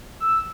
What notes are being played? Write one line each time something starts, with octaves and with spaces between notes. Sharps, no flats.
E6